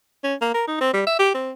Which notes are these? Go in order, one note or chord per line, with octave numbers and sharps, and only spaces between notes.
C#4
A#3
A#4
D#4
C4
G3
E5
G4
C4